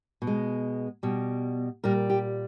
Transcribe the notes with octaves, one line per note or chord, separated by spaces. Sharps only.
B2
G#3
B2 G3
A#2 G3 A#4
G4